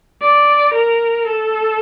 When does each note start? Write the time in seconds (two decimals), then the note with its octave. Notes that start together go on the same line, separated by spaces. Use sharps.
0.22 D5
0.74 A#4
1.27 A4